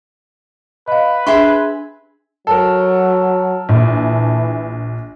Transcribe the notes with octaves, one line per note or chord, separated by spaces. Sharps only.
B4 D#5 F5
D4 G#4 E5 C6
F#3 A4 A#4
A#1 E3